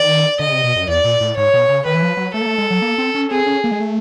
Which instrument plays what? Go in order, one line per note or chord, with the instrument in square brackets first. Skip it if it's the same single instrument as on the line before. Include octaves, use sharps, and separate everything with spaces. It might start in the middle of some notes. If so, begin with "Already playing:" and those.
Already playing: [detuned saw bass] D#3 [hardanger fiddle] D5
[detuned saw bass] D3 [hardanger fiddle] D#5
[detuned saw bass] C#3
C3
B2
F#2
[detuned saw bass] E2 [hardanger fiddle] D5
[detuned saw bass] A#2
A2
[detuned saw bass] G#2 [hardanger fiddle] C#5
[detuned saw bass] B2
C#3
[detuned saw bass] D#3 [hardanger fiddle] B4
[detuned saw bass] E3
F3
F#3
[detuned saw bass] A3 [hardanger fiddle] A4
[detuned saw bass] A#3
A3
G#3
F#3
A#3
C4
C#4
[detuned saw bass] C4 [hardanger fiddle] G#4
[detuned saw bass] C#4
A#3
G#3
A3